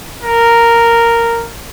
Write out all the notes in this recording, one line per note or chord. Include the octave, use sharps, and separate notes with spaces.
A#4